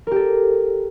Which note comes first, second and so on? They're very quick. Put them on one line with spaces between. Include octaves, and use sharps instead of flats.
A#4 G4 A4